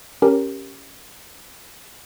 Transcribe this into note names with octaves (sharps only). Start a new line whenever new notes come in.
C#4 G4 A#4